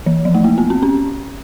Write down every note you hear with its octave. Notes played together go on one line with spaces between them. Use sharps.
E3
F3
A3
A#3
B3
C4
C#4